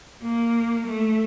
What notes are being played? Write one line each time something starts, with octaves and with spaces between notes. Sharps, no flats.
A#3
A3